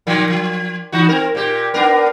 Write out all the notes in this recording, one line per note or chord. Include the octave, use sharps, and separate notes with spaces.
A#2 D#3 F3
F3
E3 D#4 F#4
C4 A#4
A#2 G4
B3 D4 A#4